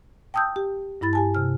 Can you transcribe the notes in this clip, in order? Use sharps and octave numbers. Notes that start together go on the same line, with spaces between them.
G5 A5 D#6 E6 G6
G4
G2 E4 B5 A6
G4 G#5 A5
C3 F6